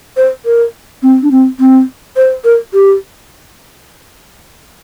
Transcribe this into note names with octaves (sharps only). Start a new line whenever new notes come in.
C5
A#4
C4
D4
C4
C4
C5
A#4
G4